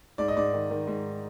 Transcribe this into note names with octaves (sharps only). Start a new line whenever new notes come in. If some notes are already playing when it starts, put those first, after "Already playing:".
G#2 D5
D#5
G#2 D5
D#3
D#3
G#2